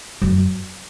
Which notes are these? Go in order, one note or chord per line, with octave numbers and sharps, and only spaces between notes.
F#2